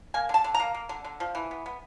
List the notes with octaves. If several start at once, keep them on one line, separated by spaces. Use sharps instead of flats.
A#3 G#5
D3 A5
D3
A#5
A#3
A#3
D3
D3
F3
E3
B3
B3